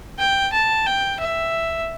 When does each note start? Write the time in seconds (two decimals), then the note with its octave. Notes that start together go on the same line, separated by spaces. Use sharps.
0.19 G5
0.53 A5
0.86 G5
1.20 E5